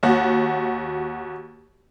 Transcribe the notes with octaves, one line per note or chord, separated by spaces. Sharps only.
D#2 F#4